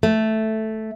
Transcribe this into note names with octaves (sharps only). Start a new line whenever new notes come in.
A3